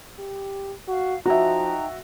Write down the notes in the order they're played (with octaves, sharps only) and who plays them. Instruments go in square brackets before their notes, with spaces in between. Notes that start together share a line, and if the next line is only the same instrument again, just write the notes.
[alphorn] G4
[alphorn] F#4 [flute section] F5
[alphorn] F3 [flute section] D#4 G5 A#5 [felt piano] F#4 E5